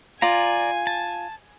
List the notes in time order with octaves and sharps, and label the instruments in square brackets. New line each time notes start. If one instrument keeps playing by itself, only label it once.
[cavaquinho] F4 [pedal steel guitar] D5 A#5 [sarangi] G#5
[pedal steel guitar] A5